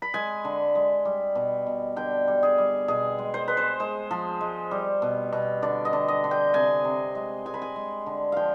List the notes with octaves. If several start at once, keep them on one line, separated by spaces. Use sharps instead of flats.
B5
G#3 G#5
D3
G#3
G3
B2
B2
D3 G5
G3
G#4
G3
B2 G#4
G#3
C5
G#3 B4
C5
G#3 C5
F3
G#3
G3
B2
B2
D3 D5
D#5
D3
D#5
D3
G5
C3 G#5
C3
G#3
G#3 G#5
B5
G#5
G#3
D3
F3 F5 G5